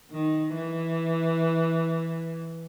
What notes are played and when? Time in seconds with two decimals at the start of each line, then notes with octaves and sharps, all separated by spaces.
0.11 D#3
0.53 E3